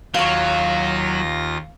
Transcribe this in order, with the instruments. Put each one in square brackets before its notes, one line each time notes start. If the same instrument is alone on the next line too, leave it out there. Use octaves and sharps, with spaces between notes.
[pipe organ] D#2 F4 A#6 [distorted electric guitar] F#3 [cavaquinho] F5 C#6